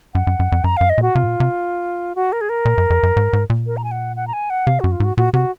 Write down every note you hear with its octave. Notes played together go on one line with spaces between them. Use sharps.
F#2 F#5
F#2
F#2
F2
F#2 A#5
F#2 F5
D#5
A#2 F#4
C3 F4
G#2
A#2
C3
F#4
A#4
G#4
A#4
A#2
F#2
F2
F#2
G#2
G#2
A#2
A#4
A#5
G#5
F#5
F#5
A#5
G#5
F#5
C3 F5
F#2 F#4
F4
G#2 F#4
A#2 F#4
C3 F#4